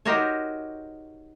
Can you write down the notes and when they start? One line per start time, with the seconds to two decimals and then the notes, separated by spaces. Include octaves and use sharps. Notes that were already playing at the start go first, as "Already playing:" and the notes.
0.05 D#4 F#4 G4 A#4 C5 C#5